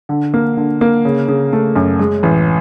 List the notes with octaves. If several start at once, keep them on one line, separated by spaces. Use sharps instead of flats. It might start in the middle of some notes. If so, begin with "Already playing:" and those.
D3
A#3
D3
A#3
C#3
C#3
A3
F#2
G#3
A1